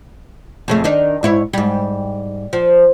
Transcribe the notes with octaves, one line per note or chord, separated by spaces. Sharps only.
F2 C#3 A3
D#3 D4 D#4
G#2 E4 C#5
G#2 G3
F3